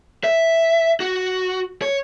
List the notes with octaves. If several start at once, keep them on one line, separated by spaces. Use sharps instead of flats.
E5
F#4
C#5